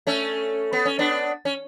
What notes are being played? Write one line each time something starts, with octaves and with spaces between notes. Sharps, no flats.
A3 C#4
B3
C#4
B3 D4
C#4